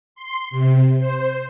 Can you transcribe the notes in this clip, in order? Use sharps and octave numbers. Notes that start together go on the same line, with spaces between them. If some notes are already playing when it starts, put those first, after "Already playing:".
C6
C3
C5